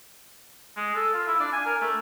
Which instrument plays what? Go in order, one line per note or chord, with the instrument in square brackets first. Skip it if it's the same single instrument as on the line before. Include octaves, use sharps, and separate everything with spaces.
[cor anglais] G#3
A4
F4
E4
D4
G#5
A#4
A3